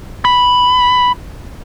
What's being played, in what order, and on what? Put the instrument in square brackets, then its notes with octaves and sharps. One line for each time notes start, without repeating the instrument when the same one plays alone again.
[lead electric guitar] B5